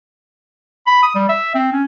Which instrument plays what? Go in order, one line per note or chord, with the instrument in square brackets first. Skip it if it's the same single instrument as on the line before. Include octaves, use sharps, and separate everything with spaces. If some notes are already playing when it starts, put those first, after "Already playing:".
[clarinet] B5
D#6
G3
E5
C4
C#4